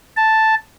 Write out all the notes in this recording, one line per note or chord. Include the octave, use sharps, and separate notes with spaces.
A5